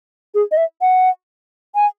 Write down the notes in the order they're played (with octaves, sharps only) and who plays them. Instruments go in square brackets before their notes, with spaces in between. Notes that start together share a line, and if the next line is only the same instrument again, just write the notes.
[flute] G#4
D#5
E5
F#5
G#5